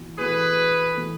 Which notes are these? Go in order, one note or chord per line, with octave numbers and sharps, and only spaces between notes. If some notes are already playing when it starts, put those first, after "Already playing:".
Already playing: E3 B3 F#4
E3 B3 F#4 G#4 A4 B4
E3 B3 F#4 A4